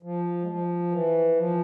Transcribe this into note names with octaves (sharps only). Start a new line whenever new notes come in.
F3
G#3
F3
E3
F3